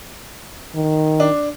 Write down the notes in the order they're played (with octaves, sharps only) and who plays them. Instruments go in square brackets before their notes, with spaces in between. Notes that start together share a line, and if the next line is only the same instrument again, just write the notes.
[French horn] D#3
[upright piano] D4